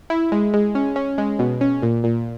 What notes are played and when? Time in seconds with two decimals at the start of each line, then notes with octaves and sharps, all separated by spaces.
0.10 E4
0.32 G#3
0.54 G#3
0.75 C#4
0.96 C#4
1.18 G#3
1.39 B2
1.61 C#4
1.82 A#2
2.04 A#2